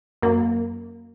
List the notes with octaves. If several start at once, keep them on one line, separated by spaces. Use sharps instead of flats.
F#2 A#3